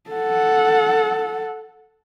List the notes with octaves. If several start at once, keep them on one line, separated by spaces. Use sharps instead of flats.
A4 F#5